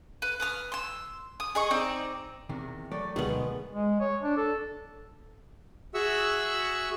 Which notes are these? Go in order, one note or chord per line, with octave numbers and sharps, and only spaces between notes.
B4
B4 D#6 F6
C6 E6
D#6
G#4 D#5 C#6
C4 D#4 D5
E2 C3 D#3
F#3 A3 D5
D2 B2 D#3 G#3 B3
G#3
C#5
D4
A4
F#4 G#4 E5 F#5 C#6 E6